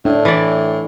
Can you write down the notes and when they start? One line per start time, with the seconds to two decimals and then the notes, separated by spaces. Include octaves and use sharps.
0.05 A2 D4
0.25 E3 D5